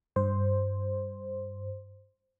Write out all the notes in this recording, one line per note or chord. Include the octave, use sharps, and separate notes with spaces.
G2 C5